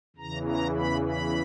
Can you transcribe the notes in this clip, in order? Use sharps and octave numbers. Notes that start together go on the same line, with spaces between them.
E2 C#3 E3 A#5
A#5
B5
B5